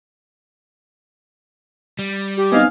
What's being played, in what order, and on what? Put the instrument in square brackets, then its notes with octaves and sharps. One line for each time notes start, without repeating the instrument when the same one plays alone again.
[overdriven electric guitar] G3
[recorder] G4
[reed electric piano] B3 C4 D#4 [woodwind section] D#5 F5 G#5